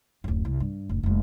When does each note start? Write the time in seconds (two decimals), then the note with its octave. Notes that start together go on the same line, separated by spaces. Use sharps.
0.24 D1 F#2
0.45 C2
0.60 G2
0.89 F1 A#1
1.03 F1 G#3